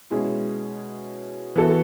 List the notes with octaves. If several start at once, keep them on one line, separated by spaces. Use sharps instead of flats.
B2 G#3 C#4 E4 G#4
E3 B3 F#4 A4